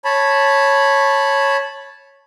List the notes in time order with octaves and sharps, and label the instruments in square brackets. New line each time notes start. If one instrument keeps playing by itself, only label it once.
[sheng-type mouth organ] C#5 A5 B5